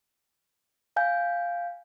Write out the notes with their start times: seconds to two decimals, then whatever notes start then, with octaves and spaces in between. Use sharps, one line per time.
0.96 F5 G#5 G6